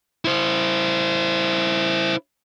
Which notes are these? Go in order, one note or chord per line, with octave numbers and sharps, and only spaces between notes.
E4 C5